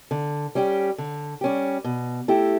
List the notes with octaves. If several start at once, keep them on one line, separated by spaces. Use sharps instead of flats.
D3
G3 C#4 G4
D3
G3 C#4 G4
B2
A3 E4 G4